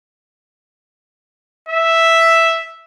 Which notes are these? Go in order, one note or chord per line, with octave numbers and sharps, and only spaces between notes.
E5